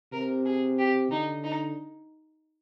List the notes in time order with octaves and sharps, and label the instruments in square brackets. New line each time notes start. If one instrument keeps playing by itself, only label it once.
[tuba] C3 [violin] A#4
[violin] G#4
G4
[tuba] D3 [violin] D#4
[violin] D#4